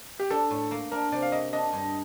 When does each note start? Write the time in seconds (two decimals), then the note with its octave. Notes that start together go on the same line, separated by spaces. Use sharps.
0.20 G4
0.30 D4 A4
0.51 A2
0.71 A#3
0.92 D4 A#4
1.12 C3 D5
1.22 F5
1.32 A#3 D#5
1.53 D4 D#5
1.73 G2